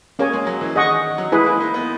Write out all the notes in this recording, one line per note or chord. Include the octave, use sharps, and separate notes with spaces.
A#3 C#4 G#4 C#5 G#5
G#3
F#3
E3
D#3 G#4 D#5 F#5 C#6
F#3
G#3 E4 G#4 B4
A#3
D#4
B3